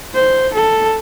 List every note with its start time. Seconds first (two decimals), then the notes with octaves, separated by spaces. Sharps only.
0.14 C5
0.53 A4